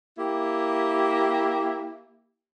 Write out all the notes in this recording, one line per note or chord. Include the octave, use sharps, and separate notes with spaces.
A#3 E4 G4